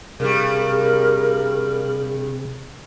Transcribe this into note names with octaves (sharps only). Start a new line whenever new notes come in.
G2 C3 G3 G#4 A#4